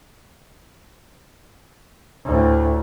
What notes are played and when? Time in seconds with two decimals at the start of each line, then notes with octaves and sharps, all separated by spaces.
2.26 D2 A2